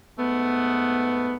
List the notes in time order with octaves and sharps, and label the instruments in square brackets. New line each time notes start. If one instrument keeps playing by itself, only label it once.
[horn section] G#2 A3 B3